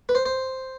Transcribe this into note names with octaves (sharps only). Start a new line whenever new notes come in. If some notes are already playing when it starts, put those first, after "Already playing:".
B4
C5
C5